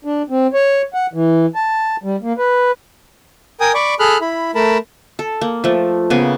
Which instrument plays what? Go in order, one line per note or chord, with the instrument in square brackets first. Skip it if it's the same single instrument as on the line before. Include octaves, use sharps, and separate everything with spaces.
[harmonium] D4
C4
C#5
F#5
E3
A5
G3
A#3
B4
[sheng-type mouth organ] A#4 G5 G#5 D#6
D5 B5 C#6 D6
G#4 A4 B5 F6 F#6
E4 B5
A3 A#4 A5 B5
[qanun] A4
A#3
F3 A3
C#3 A#3 B3 G#5